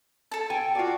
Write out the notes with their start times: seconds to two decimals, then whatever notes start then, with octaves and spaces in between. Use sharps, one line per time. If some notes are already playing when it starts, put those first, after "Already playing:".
0.31 A4 A5
0.50 G5 G#5
0.75 F4 F#4 D5